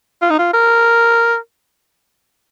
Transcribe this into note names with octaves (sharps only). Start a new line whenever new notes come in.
F4
D#4
F4
A#4